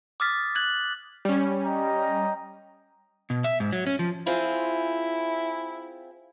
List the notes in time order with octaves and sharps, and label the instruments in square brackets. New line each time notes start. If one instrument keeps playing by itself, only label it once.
[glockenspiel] D6 D#6 F6 A6 B6
F#6 G#6 F#7
[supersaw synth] G3 C#4
[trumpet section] D#5 G5 A#5
[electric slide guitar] B2
E5
G#2
F#3
C#4
F3
[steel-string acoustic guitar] C4 F4 G#4 [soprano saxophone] E4